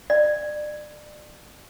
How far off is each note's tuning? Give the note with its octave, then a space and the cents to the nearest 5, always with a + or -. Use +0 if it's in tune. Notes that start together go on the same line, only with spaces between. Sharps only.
D5 +30